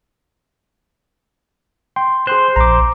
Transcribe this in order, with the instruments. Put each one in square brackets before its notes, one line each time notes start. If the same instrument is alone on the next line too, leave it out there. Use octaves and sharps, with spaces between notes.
[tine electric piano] G5 C6
[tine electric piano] G#4 C6 F#6 [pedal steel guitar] C5
[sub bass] A#1 [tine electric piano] A#5 D6